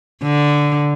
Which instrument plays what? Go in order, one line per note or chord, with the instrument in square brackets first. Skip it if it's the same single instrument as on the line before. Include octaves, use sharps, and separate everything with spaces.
[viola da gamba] D3